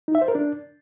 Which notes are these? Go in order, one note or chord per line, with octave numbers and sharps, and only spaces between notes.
D#4
E5
C5
A#4
D4